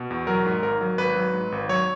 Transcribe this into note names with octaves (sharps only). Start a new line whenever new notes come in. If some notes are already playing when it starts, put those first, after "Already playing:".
Already playing: B2
E2
F#3 A#4
G#2
G#1 A#4
F#3
G#1 B4
F#3
G#2
G#1
F#3 C#5